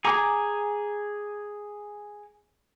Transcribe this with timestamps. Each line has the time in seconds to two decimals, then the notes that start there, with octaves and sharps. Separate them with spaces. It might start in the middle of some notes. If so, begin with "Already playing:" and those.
0.05 G#4 G#5 A#5 D6